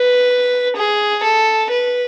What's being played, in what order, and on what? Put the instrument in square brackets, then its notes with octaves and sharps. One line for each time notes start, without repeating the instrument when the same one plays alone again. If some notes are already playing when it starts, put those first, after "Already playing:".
Already playing: [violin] B4
G#4
A4
B4